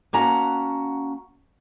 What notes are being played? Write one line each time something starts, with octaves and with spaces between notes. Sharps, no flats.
A#3 C#4 F#4 F#5 A5 A#5